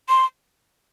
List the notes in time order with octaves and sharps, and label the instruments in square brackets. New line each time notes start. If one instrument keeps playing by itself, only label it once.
[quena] C6